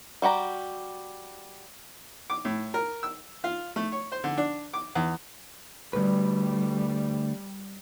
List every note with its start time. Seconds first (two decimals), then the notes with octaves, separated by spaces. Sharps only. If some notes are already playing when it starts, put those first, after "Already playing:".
0.22 G3 F#4 G4 A#5
2.30 D6
2.45 A2
2.74 A#4
3.03 E6
3.44 F4
3.76 A3
3.92 C#5
4.12 C5
4.24 D3
4.37 D4
4.74 D6
4.95 E2
5.93 D2 G3 B4